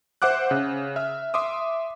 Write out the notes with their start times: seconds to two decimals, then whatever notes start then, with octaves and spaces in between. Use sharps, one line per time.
0.22 C5 E5 F#5 D6 F#6
0.51 C#3
0.96 E5 F6
1.34 E5 C6 D6 D#6